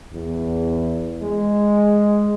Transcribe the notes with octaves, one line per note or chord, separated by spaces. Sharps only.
E2
G#3